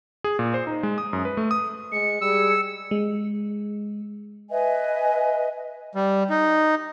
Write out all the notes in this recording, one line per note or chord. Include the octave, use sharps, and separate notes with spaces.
G#4
A#2
C5
D#4
G#3
D#6
F#2
B4
A3
D#6
G#3 C#7
G3 G#4 E6
G#3
B4 D#5 E5 G#5
G3
D#4